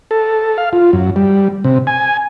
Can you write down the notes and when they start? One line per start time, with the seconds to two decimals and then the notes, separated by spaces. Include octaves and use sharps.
0.11 A4
0.58 F5
0.73 F4
0.93 F#2
1.16 G3
1.64 C3
1.87 G#5